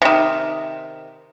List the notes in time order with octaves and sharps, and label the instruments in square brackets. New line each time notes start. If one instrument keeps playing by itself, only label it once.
[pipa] C3 D#3